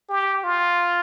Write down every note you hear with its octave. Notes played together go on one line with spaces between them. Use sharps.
G4
F4